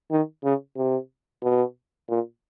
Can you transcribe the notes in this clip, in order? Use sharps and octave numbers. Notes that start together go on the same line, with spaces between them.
D#3
C#3
C3
B2
A#2